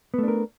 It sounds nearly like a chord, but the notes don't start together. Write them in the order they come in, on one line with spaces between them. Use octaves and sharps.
B3 A3 D4 A#4